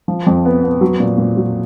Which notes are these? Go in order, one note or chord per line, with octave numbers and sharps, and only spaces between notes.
F3
F2
B3
B3
F#3
A#2
A#2
F#3